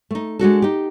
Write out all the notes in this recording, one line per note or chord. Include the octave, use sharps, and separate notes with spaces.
A3 D#4
G#3 D4 F#4 A4
D#4 G4